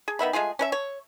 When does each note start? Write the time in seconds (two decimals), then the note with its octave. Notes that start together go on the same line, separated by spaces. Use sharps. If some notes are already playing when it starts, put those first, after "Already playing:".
0.08 G#4
0.19 D#3 B3 E5 B5
0.33 G#3 A3 F4 G#4
0.59 C#4 A#4 E5
0.72 C#5